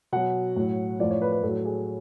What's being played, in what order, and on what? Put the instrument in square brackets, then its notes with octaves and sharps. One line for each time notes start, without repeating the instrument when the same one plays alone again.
[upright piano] B2 F#3 F#5
A2 F#3
A2 F3 D5
C#5
B4
B4
A2 F#3 A4
G#4